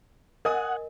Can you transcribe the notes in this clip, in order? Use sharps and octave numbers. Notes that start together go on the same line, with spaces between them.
A#4 D#5 F#5 G#5 D#6